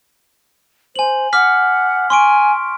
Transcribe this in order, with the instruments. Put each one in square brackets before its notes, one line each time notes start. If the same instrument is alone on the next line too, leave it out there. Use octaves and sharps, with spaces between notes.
[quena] C5 [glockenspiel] G#5 F#7
[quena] F#5 [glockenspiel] D6 F6 B6
[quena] G#5 [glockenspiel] C6 C#6 D7